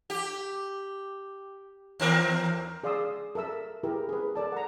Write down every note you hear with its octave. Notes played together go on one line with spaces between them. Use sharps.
G4
D#2 C4 A#4
G#4 D5 F5 C6 D#6 E6
A4 A#4 E5 E6
E4 G4 G#4 A#4 B4
G#4 B4
A4 A#4 D5 A5
F#5 A#5